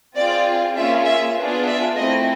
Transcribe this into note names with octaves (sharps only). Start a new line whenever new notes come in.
C4 F4 G#4 D5
A#3 C#4 F4 G#4 E5
E5
B3 D4 F4 G#4
E5
A3 C4 E4 D#5